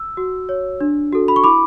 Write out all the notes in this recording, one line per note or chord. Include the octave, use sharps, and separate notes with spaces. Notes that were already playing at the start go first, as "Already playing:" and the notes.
Already playing: E6
F#4
C#5
D4
F#4 A4
B5
C#6
E4 B5 D6